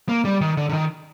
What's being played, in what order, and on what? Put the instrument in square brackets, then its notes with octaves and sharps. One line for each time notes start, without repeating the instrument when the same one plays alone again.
[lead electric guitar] A#3
G3
D#3
D3
D3
D#3